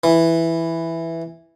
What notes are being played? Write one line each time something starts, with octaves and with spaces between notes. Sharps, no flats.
E3